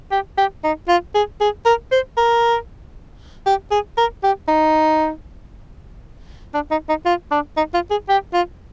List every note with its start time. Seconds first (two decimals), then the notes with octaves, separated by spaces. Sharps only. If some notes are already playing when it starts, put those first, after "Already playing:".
0.11 G4
0.38 G4
0.64 D#4
0.89 F4
1.15 G#4
1.41 G#4
1.66 A#4
1.92 C5
2.18 A#4
3.46 G4
3.71 G#4
3.98 A#4
4.23 G4
4.48 D#4
6.54 D4
6.71 D#4
6.89 D#4
7.06 F4
7.31 D4
7.57 D#4
7.74 F4
7.91 G#4
8.09 G4
8.34 F4